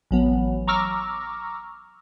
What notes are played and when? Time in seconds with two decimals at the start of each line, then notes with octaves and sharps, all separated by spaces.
0.11 A1 F#3 B3
0.68 A#5 C#6 D6 E6 F6 A#6